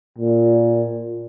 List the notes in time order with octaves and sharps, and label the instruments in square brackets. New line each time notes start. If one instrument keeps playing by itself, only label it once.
[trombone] A#2